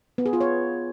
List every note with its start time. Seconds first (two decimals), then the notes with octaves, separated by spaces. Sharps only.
0.18 B3
0.26 G#4
0.33 F4
0.41 C#5